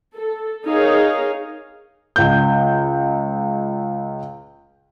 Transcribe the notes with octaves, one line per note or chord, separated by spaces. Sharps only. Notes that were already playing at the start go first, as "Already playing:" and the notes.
A4
D#4 G#4 A#4 C#5 F5
C#2 G6